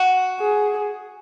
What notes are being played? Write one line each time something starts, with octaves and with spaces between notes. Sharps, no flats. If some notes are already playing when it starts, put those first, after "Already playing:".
Already playing: F#4
G#4